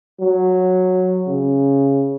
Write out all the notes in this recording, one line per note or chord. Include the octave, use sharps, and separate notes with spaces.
F#3
C#3